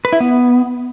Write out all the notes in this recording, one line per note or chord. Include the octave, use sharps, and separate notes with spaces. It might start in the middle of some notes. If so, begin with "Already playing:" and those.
B4
E4
B3